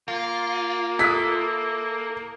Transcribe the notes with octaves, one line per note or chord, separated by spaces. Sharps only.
A#3 F4
E4 A4 D#6 F#6 B6